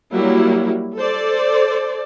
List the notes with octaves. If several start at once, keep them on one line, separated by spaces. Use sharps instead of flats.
F#3 G3 A#3 E4
A4 C5 D5